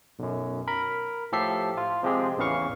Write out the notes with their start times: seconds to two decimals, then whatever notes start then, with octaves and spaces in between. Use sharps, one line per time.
0.19 B1 F#2
0.68 A#4 B5
1.32 A2 F3 G4 A4 E5 C7
1.77 F4
2.03 C3 F3 G#3 C4 G4 G#4
2.37 A1 E2 C#3 E3 F5 C#6